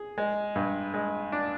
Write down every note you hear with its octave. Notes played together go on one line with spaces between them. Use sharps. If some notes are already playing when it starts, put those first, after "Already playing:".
Already playing: G#4
G#3
G2
G#3
D4